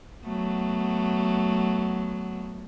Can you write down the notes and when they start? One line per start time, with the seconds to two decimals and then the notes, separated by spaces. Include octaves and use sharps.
0.24 F#3 A3 B3